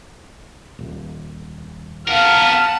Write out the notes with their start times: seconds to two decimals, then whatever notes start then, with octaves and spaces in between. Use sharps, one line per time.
0.79 D#1
2.08 B3 A#4 F5 F#5 A5 F6